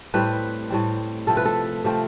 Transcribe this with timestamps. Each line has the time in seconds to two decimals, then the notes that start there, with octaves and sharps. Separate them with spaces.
0.14 A2 G3 C4 B4
0.70 A2 G3 C4
1.27 C3 F3 A3 C4 A4
1.37 B4
1.45 A4
1.84 C3 F3 A3 C4